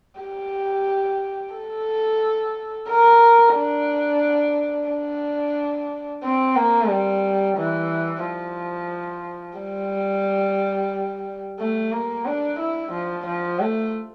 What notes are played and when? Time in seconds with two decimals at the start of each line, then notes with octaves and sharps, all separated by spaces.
0.20 G4
1.54 A4
2.88 A#4
3.56 D4
4.89 D4
6.23 C4
6.56 A#3
6.89 G3
7.57 E3
8.25 F3
9.58 G3
11.59 A3
11.92 A#3
12.25 D4
12.59 E4
12.92 F3
13.27 F3
13.60 A3